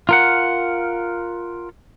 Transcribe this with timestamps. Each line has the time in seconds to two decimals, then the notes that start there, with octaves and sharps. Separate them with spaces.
0.09 F4 A#4 F#5